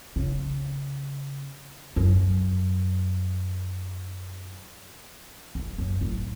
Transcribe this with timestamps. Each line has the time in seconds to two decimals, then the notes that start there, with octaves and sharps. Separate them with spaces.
0.16 C#3
1.96 F#2
5.55 E2
5.78 F#2
6.01 A2